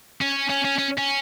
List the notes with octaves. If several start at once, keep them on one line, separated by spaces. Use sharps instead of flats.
C#4
C#4
C#4
C#4
C#4